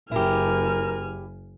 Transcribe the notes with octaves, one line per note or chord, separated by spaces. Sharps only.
F#1 E4 G4 A#4 G#5 F6